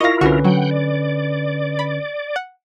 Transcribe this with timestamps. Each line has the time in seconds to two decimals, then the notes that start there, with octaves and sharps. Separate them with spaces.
0.01 E4 F4 A#4 D#5 F5 C#6 A#6
0.21 C2 D3 C#4 F#4 B4 C#6
0.44 F#3 F#5 G5
0.71 D5
1.79 B5
2.36 F#5